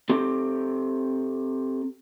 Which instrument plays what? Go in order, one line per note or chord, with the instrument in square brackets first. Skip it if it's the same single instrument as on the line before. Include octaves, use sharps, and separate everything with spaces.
[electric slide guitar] C4 G4 A4